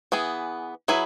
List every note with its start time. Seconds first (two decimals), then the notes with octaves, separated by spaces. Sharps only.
0.12 E3 B3 G#4
0.88 F#3 E4 G#4 B4